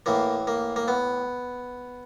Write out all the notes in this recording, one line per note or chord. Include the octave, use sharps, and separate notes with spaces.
A2 E3 A#3
A#3
A#3
B3